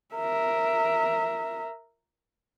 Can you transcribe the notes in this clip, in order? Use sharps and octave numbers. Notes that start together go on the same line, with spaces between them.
A#4 E5